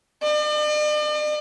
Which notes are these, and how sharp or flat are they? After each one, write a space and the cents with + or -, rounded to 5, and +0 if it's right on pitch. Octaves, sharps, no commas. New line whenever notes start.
D5 +45